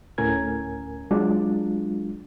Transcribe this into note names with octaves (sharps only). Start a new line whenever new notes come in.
D2 A2 C#4 A#4 G#5 G#6
F#3 G#3 D4 F4